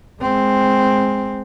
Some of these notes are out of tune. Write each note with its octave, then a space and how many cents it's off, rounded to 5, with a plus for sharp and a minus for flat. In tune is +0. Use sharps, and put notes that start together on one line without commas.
G#3 +0 C4 +0